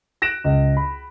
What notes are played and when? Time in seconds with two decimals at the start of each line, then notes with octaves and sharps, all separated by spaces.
0.22 F#6 A#6 D7 E7
0.44 C#2
0.77 B5